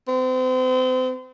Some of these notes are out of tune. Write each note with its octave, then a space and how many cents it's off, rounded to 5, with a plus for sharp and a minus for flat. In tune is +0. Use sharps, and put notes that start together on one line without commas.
C4 -35